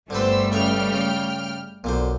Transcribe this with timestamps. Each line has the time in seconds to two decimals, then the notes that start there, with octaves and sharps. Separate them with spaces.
0.10 G1 D3 G3 A3 C4 B4 C5 E6
0.52 A1 C#3 E5 G5 F6
0.93 C#3
1.84 B1 A#2 D3 C5